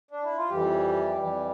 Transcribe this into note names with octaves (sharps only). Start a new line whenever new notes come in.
D4
E4
F4
F2 E3 G3 G4
F2 E3 G3